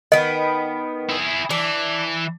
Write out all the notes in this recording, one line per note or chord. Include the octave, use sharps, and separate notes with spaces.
D#3 B3 D#5
E4 G#4
E3 D4